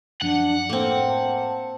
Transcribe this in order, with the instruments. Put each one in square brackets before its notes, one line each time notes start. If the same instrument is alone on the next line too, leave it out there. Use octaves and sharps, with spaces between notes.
[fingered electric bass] F#2 F3 [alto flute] D4 [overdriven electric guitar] F#5
[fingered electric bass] A2 [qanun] A#3 C4 [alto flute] A4
[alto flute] A5